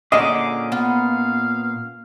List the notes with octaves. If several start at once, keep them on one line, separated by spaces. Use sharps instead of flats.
A#2 D3 C#4 G#4 D#5 A5 D6
B3 F5